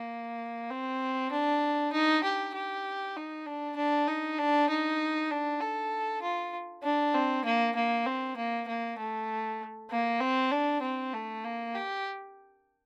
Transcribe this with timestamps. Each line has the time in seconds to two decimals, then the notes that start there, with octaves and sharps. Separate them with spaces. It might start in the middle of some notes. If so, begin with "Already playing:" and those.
Already playing: A#3
0.70 C4
1.32 D4
1.93 D#4
2.24 G4
2.55 G4
3.16 D#4
3.46 D4
3.77 D4
4.08 D#4
4.38 D4
4.70 D#4
5.31 D4
5.61 A4
6.23 F4
6.83 D4
7.15 C4
7.45 A#3
7.76 A#3
8.06 C4
8.37 A#3
8.68 A#3
8.99 A3
9.91 A#3
10.21 C4
10.52 D4
10.82 C4
11.13 A3
11.44 A#3
11.75 G4